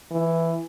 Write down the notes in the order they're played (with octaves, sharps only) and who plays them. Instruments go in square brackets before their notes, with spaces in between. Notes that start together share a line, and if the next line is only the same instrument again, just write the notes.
[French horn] E3